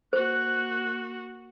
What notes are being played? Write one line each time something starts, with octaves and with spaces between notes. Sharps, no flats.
A#3 F#4 C5 F#6